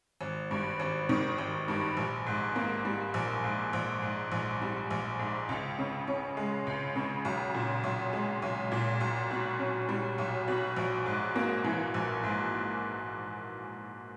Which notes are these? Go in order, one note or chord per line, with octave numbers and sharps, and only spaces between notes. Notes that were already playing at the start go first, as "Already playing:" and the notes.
G#1
G2
G#1
D#3
G#1
G2
A#1
G#2
A#3
G3
A#1
G#2
A#1
G#2
A#1
G3
A#1
G#2
C#2
C#3
C#4
G#3
C#2
C#3
B1
A#2
B1
G#3
B1
A#2
B1
B2
C#4
G3
B1
B2
A#1
G#2
A#3
E3
A#1
G#2